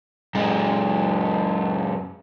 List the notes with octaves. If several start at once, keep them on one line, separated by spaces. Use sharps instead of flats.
F#2 G#3